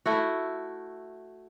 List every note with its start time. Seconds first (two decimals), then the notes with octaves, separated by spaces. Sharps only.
0.06 A3 E4 F#4